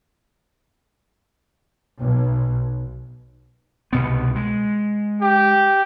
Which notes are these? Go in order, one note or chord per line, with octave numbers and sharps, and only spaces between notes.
B1
C2 B2 B3
G#3
G4